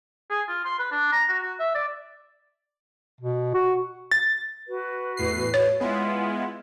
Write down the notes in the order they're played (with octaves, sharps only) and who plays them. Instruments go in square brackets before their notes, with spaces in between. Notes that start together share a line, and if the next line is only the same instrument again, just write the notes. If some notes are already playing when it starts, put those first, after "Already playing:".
[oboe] G#4
F4
C6
B4
D4
A#5
F#4
F#4
E5
D5
[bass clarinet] B2
F#4
[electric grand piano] A6
[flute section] F#4 B4
[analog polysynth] E2 A2 C7
[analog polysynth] A2 [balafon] C#5
[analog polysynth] G#3 B3 E4 [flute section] F4